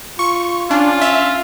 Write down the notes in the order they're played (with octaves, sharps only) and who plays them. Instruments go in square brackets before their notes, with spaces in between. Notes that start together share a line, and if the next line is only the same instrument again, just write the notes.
[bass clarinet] F4 [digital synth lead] C#6
[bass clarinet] C#4 [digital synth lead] D4 [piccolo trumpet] F4
[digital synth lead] E5